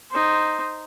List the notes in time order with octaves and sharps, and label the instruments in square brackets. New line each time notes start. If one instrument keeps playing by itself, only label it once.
[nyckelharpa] D#4 C5